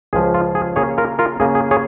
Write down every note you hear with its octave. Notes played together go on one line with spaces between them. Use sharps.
C#2 C#3 F3 G#4
F4
G#4
C#3 A#3 C#4 G#4 C#5
F4 A#4
F4 A#4
C#3 A#3 C#4 G#4
G#4
G#4 C#5